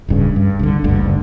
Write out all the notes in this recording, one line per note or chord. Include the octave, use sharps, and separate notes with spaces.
D1 G2 C#3
G2
C2 D3
F#1 D2 G2 D3